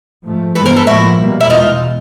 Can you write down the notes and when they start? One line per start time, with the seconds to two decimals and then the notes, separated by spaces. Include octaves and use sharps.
0.24 G#2 F3 A3
0.55 G2 E3 G#3 B3 A4 B4
0.66 A#4 C5
0.76 A4 B4
0.87 A2 F3 A#3 E4 F#4
1.19 B2 G3 A#3
1.41 E4
1.50 E2 B2 G#3 D#4 F4